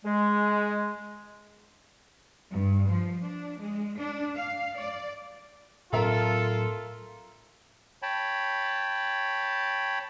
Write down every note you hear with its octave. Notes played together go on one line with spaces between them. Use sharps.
G#3
G2
F3
D4
G#3
D4
F5
D5
A2 F#3 C4 F4 A4 A#4 E5 A#5
C#5 G5 A5 B5